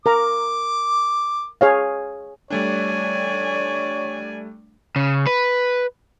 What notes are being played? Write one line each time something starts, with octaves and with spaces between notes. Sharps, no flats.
A#4 A#5 D6
G#4 C#5 F5
G3 A3 D4 C#5 D5 G#5
C#3
B4